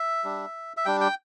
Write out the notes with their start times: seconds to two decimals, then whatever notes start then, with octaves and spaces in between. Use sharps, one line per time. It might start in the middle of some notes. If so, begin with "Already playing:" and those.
Already playing: E5
0.24 G3 D4
0.77 E5
0.85 G3 D4 G5
1.01 G5